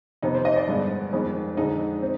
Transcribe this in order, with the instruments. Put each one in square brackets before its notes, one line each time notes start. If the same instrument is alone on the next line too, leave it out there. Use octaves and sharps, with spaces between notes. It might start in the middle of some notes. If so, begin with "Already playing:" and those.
[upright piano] F2 C3 D#3 B3 D#4
C5
D#5
D5
G2 D3 G#3 B3
F2 D#3 G#3 B3
F2 D3 G#3 D#4
C4